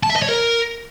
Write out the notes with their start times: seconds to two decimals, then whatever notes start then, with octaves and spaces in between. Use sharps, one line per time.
0.03 A5
0.10 E5
0.16 D#5
0.22 C#5
0.29 A#4